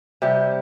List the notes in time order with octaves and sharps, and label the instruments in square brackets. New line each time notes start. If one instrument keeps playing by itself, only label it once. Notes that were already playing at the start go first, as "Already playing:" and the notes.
[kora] C3 G3